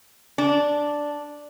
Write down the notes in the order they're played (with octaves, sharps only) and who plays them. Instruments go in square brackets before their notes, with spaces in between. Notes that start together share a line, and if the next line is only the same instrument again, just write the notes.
[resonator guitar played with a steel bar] D4